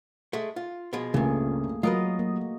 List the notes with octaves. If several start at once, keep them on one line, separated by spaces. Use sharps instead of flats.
G#3 A3
F4
B2 F3 G#3
C#2 G2 A#2 A3 A#3 C#4 G#4
F#3 F4 F#4 A#4 B4 D#5 D#6
A#3